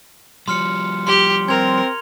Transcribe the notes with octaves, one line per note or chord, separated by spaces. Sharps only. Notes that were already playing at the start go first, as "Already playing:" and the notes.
F3 G3 C6 F6 C#7
G4 C6 G7
C4 A#4 G#6 F7